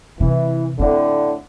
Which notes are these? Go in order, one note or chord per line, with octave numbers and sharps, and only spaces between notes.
C3 E3
A2 D3 C4